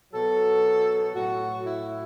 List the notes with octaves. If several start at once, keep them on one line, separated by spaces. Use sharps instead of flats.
B2 F#3 A4
A2 F#3 F#4
E4